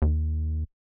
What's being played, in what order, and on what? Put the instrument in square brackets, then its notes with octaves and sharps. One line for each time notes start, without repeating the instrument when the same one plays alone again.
[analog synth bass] D#2